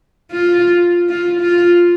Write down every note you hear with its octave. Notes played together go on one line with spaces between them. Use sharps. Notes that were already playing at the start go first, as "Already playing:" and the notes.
F4
F4
F4